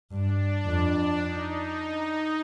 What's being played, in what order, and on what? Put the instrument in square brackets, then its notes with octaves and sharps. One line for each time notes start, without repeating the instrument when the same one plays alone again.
[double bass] G2 [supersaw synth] D4
[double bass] F2
[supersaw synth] D#4
D#4